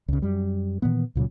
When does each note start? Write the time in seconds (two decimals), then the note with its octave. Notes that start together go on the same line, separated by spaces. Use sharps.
0.08 C#2 C#3
0.22 F#2 G3
0.82 A#2 D#3 E3 B3
1.15 C#2 A#2 C#3 F#3